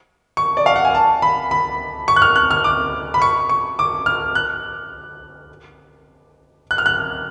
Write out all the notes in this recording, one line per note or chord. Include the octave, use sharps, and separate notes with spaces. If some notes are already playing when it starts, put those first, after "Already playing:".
C#6
D5
F5
F#5
G#5
A5
B5
B5
C#6
F#6
F6
F#6
F6
D6
B5
C#6
C#6
D6
F6
F#6
F#6
F6
F#6